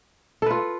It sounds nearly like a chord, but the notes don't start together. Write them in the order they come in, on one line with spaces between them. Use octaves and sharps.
A4 B4 F4